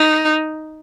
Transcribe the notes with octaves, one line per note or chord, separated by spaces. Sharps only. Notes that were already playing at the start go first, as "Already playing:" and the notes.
Already playing: D#4